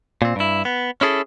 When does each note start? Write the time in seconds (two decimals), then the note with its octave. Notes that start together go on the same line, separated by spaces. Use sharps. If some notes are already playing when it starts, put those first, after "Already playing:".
0.22 A#2 C4
0.36 G2 E4
0.65 B3
1.01 C#4 E4 G#4 A4